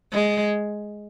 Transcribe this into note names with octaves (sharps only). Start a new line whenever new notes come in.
G#3